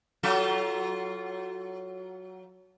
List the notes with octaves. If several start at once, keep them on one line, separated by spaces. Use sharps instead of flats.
F#3 F4 A4